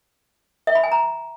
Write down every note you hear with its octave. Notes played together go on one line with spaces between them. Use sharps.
E5
B5
G#5
A#5